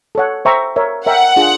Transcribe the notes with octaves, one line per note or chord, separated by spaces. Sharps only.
A4 C#5 F#5
C5 E5 G5 A#5 C#6
A#4 C#5 E5
A#4 C#5 E5 F#5 G5 A#5
D4 F4 G#4